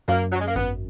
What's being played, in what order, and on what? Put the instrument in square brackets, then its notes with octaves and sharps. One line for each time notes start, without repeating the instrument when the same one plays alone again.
[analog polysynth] F#2 [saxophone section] A#3
[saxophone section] F#3
G#3
A#3
[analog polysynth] G#1 [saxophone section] B3